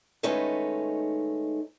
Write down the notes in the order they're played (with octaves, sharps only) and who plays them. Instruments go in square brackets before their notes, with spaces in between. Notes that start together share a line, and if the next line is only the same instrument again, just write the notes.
[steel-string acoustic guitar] D#3 G#3 A3 C#4 D#4 B4